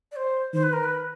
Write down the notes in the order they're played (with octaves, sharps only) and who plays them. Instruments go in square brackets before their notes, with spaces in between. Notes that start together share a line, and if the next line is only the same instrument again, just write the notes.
[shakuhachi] D5
C5
[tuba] D#3 [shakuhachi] C5
[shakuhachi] B4
A#4
B4